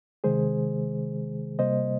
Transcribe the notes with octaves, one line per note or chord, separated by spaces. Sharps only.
C3 D#3 G#3 G#4 C5
C3 G3 A#3 C5 D#5